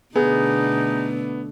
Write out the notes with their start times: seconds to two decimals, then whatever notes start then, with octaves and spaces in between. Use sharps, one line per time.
0.16 B2 D3 A3 B3 D#4 G#4